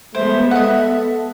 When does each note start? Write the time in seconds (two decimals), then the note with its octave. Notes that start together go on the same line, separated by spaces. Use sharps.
0.15 G#3 A3 B3 C5 E5
0.51 A4 D#5 F#5